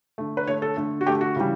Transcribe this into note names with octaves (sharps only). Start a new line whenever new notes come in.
D3 A3
B4
D3 A3 C#5
A4
D3 A3
F#4
D3 A3 G4
F#4
C#3 E3 G3